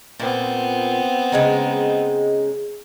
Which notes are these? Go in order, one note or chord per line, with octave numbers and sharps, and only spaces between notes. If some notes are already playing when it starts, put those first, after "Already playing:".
A#2 B3 C4
C#3 G#3 D#4